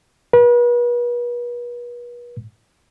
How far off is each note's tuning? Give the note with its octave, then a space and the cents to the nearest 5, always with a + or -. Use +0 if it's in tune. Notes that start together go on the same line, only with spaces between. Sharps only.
B4 -40